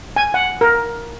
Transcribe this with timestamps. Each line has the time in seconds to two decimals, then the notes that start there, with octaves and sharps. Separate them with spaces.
0.16 G#5
0.34 F#5
0.61 A#4